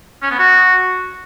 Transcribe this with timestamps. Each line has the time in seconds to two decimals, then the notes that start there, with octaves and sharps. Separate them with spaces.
0.22 C#4
0.30 B3
0.38 F#4